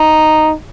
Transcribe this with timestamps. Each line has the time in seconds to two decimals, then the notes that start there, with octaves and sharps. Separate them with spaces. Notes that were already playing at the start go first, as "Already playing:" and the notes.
Already playing: D#4